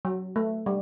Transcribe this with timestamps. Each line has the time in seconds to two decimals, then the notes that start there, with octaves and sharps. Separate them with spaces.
0.05 F#3
0.36 A3
0.66 G3